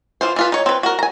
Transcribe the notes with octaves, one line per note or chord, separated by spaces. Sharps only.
E3 F4 C5
E3 F4 B4
D#4 C#5
C4 B4
F#4 A#4
G#5 A#5